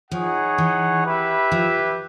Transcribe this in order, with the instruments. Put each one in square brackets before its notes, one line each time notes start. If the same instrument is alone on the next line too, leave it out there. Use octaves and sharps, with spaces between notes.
[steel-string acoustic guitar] F3 [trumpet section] D#4 G#4 C#5 F#5
[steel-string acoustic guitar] E3
[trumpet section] E4 G4 B4 E5
[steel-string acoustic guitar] F3